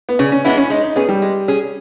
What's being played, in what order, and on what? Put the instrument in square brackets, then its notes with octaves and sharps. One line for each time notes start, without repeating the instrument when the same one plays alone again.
[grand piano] B3
[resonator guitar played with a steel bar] C#3 [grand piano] C#4
[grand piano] C#4
[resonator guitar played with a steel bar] E3 G#3 B3 E4 [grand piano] C#4
[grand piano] C#4
[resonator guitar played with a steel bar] G#3 [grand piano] D#4
[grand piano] D#4
[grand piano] B3 [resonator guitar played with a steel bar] C#4 G#4
[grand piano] G3
[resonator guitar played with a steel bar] G#3
C#4 G#4